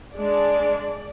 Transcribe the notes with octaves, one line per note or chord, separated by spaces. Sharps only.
G#3 D4 D5